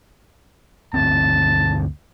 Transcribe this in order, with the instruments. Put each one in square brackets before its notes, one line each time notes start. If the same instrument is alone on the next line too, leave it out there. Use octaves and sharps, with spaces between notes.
[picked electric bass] G1 D2 C4 [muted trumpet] A5